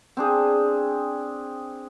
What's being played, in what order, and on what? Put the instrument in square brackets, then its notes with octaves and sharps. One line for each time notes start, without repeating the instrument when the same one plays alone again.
[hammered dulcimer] C4 D4 G#4